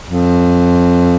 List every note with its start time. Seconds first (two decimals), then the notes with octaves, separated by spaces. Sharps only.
0.10 F2